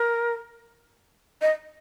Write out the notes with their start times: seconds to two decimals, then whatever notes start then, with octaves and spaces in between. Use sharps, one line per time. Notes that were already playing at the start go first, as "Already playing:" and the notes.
Already playing: A#4
1.42 D#5